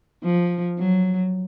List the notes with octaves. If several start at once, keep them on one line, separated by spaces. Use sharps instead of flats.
F3
F#3